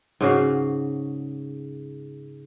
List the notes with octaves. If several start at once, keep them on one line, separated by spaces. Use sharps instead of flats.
G#2 C#3 F#4 F5